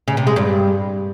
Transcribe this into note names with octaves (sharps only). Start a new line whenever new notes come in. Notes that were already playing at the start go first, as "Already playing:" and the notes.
C#3
C3
G#3
G2